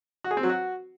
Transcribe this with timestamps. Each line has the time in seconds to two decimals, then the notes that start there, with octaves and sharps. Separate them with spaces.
0.24 F#4
0.31 G#4
0.37 C4
0.43 F#3
0.50 F#4